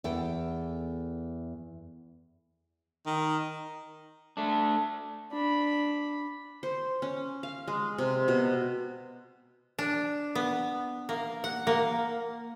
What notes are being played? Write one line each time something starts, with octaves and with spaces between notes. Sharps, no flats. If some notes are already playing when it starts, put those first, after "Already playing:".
E2 A4 G5
D#3
A3 D4
D4 B5
C5
C#4
F5
G#3
C3
B2
D4
B3
A#3
F#5
A#3